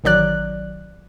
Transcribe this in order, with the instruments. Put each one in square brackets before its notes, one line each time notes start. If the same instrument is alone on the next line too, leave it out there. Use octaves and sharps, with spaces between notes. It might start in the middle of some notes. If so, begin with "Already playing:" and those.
[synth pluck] A1 D#3 F#3 D5 F#6